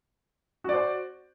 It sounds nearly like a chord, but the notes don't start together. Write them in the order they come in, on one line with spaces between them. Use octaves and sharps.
F#4 D5 C5